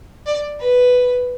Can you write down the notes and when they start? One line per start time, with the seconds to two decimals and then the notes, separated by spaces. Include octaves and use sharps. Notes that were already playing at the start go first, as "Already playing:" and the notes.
0.26 D5
0.60 B4